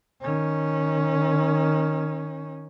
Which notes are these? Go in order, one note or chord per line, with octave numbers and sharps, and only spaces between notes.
D#3 C#4